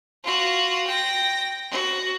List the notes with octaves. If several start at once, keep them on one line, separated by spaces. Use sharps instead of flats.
F4 F#4
G5 A#6
F#4